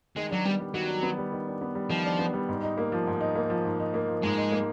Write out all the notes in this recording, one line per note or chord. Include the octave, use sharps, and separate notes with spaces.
D#3 G#3
F#3 D4
G3 B3
G3
D#3 F#3
D4
B3
G3
D#3
D4
B3
G3
D#3 F3
D4
B3
G3
G#2
D#4
A#3
F3
G#2
D#4
A#3
F3
G#2
D#4
A#3
F3
G#2 G#3
D#4
A#3